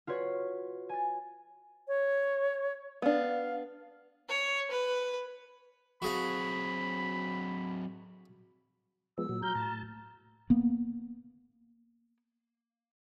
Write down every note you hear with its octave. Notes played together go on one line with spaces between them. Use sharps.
F4 F#4 B4 C#5
G#5 A6
C#5
B3 D4 F5
C#5
B4
F#3 C4 F#4 G#4 F5 B5
F3 G#3 B3 E6
A#2 F#3
F#3 A#5 F6 G6
A2 A5
A#3 B3